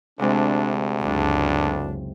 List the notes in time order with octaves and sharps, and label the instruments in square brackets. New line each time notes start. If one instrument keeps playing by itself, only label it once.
[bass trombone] D2 [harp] C3 G#3 C4 [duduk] D4
[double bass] F#1 C#2 [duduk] D4